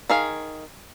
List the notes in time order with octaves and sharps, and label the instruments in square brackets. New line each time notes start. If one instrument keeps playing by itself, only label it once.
[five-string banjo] D#3 G#4 F5